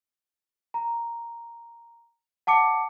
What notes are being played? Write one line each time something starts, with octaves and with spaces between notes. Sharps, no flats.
A#5
F#5 A5 D6 C#7